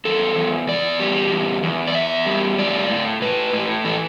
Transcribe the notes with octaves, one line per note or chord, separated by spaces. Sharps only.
E2 A4
E2
E2 D5
G3
E2
E2
D5
E2 E5
G3
A2 D5
A2
A2 B4
A2
E3 A4